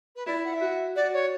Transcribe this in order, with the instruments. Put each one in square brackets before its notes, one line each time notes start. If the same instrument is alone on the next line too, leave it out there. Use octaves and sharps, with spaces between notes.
[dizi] B4
[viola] E4 [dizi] D5
[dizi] F#5
E5
[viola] F#4
[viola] F#4 [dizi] D5
[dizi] C#5